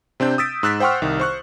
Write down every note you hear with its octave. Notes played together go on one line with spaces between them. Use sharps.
C3 C4 D4 G6
D#6 E6 A6 B6 D7
G#2 E6 F#6 A6 B6
C5 F#5 G5 C6 C#6 F6
C2 D#3
C5 C#6 F#6